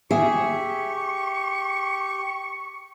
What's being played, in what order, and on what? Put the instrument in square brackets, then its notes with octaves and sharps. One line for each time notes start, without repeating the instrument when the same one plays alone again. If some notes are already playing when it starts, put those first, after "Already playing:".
[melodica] G4 [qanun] G#4 [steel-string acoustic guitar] E5 [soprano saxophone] C#6